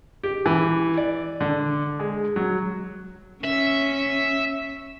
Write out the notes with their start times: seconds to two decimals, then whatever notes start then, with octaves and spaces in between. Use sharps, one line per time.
0.23 G4
0.46 E3
0.97 D5
1.41 D3
1.99 G#3
2.36 F#3
3.44 C#4 E5